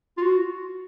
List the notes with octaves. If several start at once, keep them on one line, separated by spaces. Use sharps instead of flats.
F4
F#4